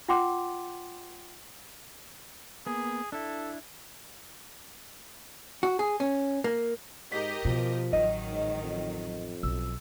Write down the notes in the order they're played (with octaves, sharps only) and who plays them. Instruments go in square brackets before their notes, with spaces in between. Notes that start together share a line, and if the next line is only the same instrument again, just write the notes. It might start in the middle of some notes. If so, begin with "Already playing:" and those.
[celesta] F4 F#5 G5 C6 D6
[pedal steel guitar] A#3 B3 [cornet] G#4
[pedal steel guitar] D4 E4 [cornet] A4
[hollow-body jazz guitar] F#4
G#4
C#4
A#3
[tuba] G#2 [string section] G4 A#4 D#5 [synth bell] B6
[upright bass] B2 [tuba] F3
[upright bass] A1 [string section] D#3 F#3 [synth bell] D#5
[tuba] G#2
F2
[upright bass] B1 [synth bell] E6